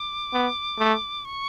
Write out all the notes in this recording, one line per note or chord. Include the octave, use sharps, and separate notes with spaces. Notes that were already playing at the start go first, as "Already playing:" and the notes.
Already playing: D6
B3
A3
C#6